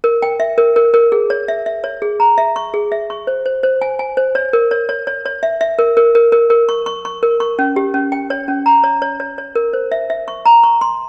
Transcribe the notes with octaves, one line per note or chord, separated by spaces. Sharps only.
A#4
G5
E5
A#4
A#4
A#4
G#4
C#5
E5
E5
C#5
G#4
A#5
E5
C#6
G#4
E5
C#6
C5
C5
C5
G#5
G#5
C5
C#5
A#4
C#5
C#5
C#5
C#5
E5
E5
A#4
A#4
A#4
A#4
A#4
C#6
C#6
C#6
A#4
C#6
C#4
G4
C#4
G5
C#5
C#4
A#5
C#5
C#5
C#5
C#5
A#4
C5
E5
E5
C#6
A#5
C#6
C6